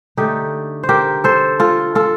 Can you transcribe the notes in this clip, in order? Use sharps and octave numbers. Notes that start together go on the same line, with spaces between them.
D3 A3 D#4 G4
C5
G4 A#4
A4 C5
F4 A4
F4 A4